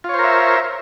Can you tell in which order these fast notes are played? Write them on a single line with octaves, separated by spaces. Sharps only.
F4 C#5 C5 A#4 E5